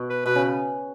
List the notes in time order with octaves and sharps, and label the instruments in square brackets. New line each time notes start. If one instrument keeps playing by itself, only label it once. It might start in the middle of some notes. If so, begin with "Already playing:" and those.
Already playing: [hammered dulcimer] B2
[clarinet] B4
[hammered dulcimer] B2 [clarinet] B4
[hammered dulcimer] C#3